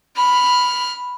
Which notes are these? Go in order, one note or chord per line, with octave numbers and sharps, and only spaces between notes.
B5 F6